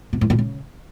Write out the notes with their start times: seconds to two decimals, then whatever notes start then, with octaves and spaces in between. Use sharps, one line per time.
0.13 B2
0.21 A2
0.30 A#2
0.39 C#3